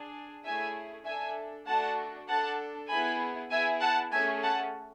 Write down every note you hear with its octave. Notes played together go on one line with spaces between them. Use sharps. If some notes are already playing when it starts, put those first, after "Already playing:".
Already playing: D4 G#4
A3 C#4 E4 G#4 E5 G#5
D4 A4 E5 G#5
A3 D4 F#4 A4 F#5 A5
D4 A4 F#5 A5
B3 E4 G#4 G#5 B5
B3 E4 G#4 E5 G#5
F#5 A5
A3 C#4 G#4 E5 G#5
F#5 A5